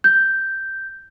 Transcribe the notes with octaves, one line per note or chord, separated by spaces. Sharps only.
G6